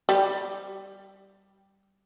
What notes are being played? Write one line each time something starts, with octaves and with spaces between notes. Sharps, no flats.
G3 G4